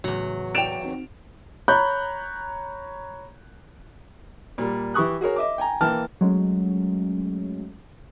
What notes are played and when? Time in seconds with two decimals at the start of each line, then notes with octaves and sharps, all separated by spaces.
0.04 E2 A2 C#3 F#3
0.55 D5 G5 D7 E7 F7
0.83 C4 D#4 F#4
1.68 C#5 A#5 B5 F#6 G6
4.58 A#2 G3
4.94 E3 G4 C#6 D#6 F#6
5.21 F#4 G#4 A#4 C#5
5.36 D#5 E5 D6
5.58 G5 G#5 A#5
5.81 E3 A#3 G5 A5 F6
6.21 F#3 G#3 A3 C#4